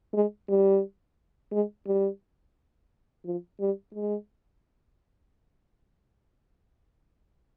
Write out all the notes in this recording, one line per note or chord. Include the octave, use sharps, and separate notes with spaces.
G#3
G3
G#3
G3
F3
G3
G#3